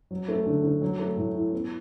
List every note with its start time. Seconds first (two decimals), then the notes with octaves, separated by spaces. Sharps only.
0.11 F#3
0.28 A3
0.46 D3
0.63 D3
0.82 F#3
0.99 A3
1.17 A2
1.35 E4
1.53 B3